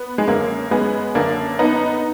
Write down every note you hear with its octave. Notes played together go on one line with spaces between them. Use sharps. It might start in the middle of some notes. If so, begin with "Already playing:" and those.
Already playing: B3
G#3
F#2 D3 A#3
G#3 B3
F#2 D3 A#3 D4
B3 D#4